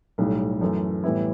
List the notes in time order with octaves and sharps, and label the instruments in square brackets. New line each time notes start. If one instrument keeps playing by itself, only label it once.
[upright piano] B1 A2 G3
F#2 E3 A3
A2 E3 G3 B3 E4